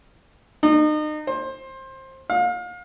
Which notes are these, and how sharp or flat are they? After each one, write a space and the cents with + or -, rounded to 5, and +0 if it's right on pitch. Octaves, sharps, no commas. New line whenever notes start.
D#4 -35
C5 +20
F5 +35